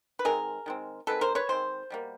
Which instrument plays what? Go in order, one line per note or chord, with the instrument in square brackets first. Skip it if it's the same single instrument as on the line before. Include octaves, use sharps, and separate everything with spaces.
[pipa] B4
D#3 G#3 C4 G#4 A#4
D#3 G#3 C4
D#3 G#3 C4 A4 B4
A#4 C5
B4 C#5
D#3 G#3 C4 C5
B2 G3 A#3